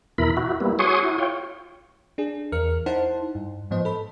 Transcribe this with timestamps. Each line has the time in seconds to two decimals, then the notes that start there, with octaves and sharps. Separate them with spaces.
0.18 E2 B2 E4 A#4 B5
0.37 E4 F#4
0.60 G3 A#3 B3 E4
0.79 F#4 G#4 C#5 C6 C#6 D#6
1.03 E4 F#4
1.18 F4 C#5 G5
2.18 D4 G#4
2.52 E2 A#4 F6 C#7
2.86 D#4 E4 C5 F#5 A5 C6
3.35 G2
3.71 G#2 F3 B3 C5 D#5
3.85 A4 B5